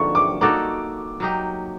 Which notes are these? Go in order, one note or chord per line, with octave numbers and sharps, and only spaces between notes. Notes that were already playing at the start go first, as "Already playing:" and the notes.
Already playing: D3 F3 A#3 D#4 C#6
D6
A#3 D#4 F#4 A4 D6
F#3 A#3 D#4 G4